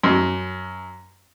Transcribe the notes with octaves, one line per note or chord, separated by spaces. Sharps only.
F#2